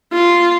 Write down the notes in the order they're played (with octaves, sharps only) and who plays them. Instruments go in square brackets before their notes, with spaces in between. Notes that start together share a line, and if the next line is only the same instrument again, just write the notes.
[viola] F4